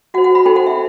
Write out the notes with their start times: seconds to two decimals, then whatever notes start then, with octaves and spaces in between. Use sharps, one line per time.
0.14 F#4 F#5
0.18 C5
0.24 F#5
0.35 B5
0.45 D#4 A4 C5 G5
0.56 F#5
0.66 E5